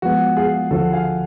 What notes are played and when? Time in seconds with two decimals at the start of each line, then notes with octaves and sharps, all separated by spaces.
0.02 F3 G#3 B3 F#4
0.36 F4 G#4
0.71 D2 D3 F3 F#4 A4
0.93 F5 G#5